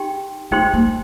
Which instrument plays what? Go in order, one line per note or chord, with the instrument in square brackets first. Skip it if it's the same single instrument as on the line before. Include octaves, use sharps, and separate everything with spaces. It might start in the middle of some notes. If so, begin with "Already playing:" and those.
Already playing: [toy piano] D#4 G4 G5 C6
[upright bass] A3 [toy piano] D#4 G4 C5 G5 C6
[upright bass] A#3